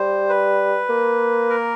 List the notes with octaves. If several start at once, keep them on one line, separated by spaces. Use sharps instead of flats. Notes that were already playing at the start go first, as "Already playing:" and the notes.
Already playing: G3 C5
B4
A#3
A#4